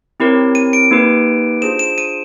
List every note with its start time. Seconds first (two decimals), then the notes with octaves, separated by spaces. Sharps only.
0.20 C4 E4 G4 A#4 C#5
0.55 D#7
0.73 D7
0.91 A#3 D#4 G4 B4
1.61 D4 F4 G#4 C5 E7
1.79 E7
1.98 D#7